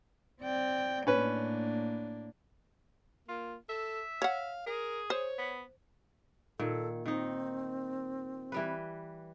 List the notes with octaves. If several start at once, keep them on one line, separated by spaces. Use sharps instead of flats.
C4 D5 G5
A2 A#3 C#4 D4 B4
A#3 F4
A4 E5
C#5 F5 F#5
G#4 A#4
C5 C#5
B3
A#2 D#3 A4
D#3 C4 D#4
E3 G3 B4